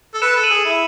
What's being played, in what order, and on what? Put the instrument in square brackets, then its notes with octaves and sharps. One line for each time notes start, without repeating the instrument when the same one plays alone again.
[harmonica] A4
[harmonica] B4 [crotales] C#7 E7
[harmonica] A4
[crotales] D#7 F#7
[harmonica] G#4
E4